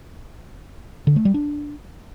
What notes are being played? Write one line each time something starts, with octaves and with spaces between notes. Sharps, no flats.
D3
A3
G3
D4